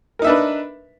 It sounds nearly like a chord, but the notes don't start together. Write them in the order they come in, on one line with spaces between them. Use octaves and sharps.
A#4 D#4 E5 D4 B4